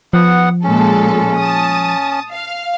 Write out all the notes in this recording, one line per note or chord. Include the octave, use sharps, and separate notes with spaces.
F3 B3 F#5
A#2 G#3 C#4 A4
A5 D#6
F5